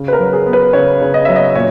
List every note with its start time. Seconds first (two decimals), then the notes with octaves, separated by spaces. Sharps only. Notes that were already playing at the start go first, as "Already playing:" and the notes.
Already playing: C#3
0.08 B4
0.13 A#4
0.19 F#3
0.33 G#4
0.46 B3
0.53 B4
0.73 C#3 C#5
1.01 C#3
1.14 D#5
1.25 F#3 E5
1.36 D#5
1.55 A#2 C#5